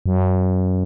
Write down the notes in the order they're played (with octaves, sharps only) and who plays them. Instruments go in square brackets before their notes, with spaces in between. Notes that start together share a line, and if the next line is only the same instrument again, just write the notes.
[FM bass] F#2